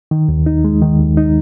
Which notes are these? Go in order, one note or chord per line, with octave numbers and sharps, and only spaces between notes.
D#3
D#2
D#4
G#3
D#3
D#2
D#4